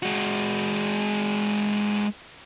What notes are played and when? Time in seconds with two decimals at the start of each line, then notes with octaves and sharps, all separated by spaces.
0.03 G#3 F#4